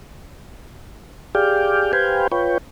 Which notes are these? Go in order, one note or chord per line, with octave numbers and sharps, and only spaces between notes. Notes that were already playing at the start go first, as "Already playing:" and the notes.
G4 G#4 D5 F5 G5
G4 B4 C5 F5 G5 G#5
F4 B4 C#5 G5